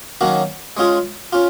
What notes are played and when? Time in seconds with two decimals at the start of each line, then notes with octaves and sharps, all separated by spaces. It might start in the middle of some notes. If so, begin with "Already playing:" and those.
0.21 D#3 F#3 A#3 C#4 F#4
0.77 G#3 C#4 F4 G#4
1.33 C#4 F4